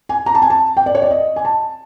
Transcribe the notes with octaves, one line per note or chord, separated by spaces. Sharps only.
G#5
A#5
A5
G#5
A5
G5
D5
C#5
D5
D#5
G#5
A5